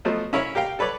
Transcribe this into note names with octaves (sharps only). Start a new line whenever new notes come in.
F3 F#3 A3 B3 C5 D#5
C#4 E4 A#4 C#5
G4 A#4 F5 G5
A4 B4 C#5 D5